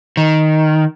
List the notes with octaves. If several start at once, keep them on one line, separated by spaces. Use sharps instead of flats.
D#3